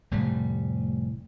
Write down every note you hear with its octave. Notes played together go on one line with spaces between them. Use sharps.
F1 A2 G3